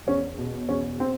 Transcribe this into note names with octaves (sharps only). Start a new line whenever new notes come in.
E2 C#4
B2
E2 C#4
C4